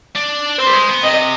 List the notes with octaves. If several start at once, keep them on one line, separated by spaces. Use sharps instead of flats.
D4
C4 C5
G3
G#3
B3
C3 D#5